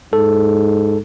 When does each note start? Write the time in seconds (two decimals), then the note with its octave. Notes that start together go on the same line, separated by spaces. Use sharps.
0.13 G#2 A4